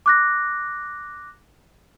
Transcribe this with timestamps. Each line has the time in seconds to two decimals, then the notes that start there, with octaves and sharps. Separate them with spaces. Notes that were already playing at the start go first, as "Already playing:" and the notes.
0.06 D6 F#6 A#6